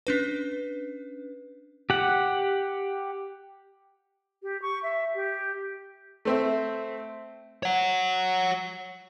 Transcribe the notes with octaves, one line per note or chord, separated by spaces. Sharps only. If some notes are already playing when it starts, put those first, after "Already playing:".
C#4 D4 B4
G4 F#5
G4
C#6
E5
G4
A3 C4 E5
C#5 F#5